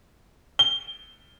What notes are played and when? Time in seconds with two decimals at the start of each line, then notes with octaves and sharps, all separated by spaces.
0.59 G7